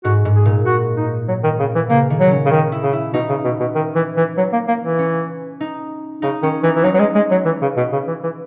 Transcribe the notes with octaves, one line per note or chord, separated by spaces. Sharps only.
G#2 F#4
G#2
G#4
A#2
F#4
D#4
F#3
D#3
C#3
E3
C#3 A#3
D#3
F#3
C#4
C#3
D#3
E4
C#3
E4
B2 D#4
C#3
B2
B2
D#3
E3
E3
F#3
A#3
A#3
E3
C#4
D#4
C#3 D#4
D#3 C#4
E3 D#4
E3
F#3 D#4
F#3
G#3
G#3
F#3
E3
C#3
B2
C#3
E3
E3